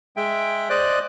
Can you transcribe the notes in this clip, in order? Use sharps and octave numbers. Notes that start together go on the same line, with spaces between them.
G#3 E5 G5
C5 D5 D#5 F#6